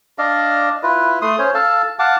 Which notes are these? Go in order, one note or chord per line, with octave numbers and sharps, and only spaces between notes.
D4 D5 D#5 F5
E4 F4 B4
A3 C6 D#6
C#4 C5 C#5
A4 F5 A5
F5 F#5 A5 D6